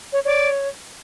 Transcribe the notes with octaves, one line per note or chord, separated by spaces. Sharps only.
C#5
C#5 D5